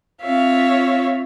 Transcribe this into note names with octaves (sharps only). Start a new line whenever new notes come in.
C4 F4 C#5 E5 F5